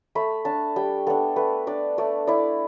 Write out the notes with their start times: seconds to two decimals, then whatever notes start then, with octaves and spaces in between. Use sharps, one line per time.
0.15 A3 B5
0.45 D4 A5
0.76 G3 G5
1.07 B3 D4 A4
1.36 A3 B4
1.67 D4 D5
1.98 A3 D5
2.27 E4 D5